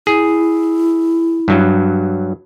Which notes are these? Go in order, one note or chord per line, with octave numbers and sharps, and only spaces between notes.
E4 G#4
G2 F#3